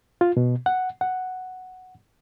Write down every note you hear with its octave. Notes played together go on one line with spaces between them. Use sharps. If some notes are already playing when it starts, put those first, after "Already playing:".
F4
B2
F#5
F#5